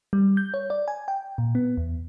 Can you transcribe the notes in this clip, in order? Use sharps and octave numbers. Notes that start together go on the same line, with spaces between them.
G3
G6
C#5
D5
G#5
G5
A#2
B3
E2